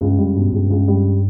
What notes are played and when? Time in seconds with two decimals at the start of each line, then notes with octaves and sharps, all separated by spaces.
0.01 C#2 G2
0.18 F#2 G3
0.35 G2 B2
0.52 C#2 G2
0.70 C#2
0.88 G3